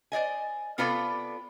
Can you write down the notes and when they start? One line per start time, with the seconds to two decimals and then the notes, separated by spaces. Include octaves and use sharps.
0.12 C5 D5 D#5 G#5
0.78 C3 B3 F4 A4 B4 D5